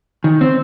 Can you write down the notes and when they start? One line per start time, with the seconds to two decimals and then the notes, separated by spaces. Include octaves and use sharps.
0.24 D#3
0.41 C4